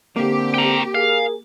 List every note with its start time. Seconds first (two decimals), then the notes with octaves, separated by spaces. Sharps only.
0.16 D3 A#3 C4 G4
0.54 G5 A#5
0.95 G#4 A#4 F5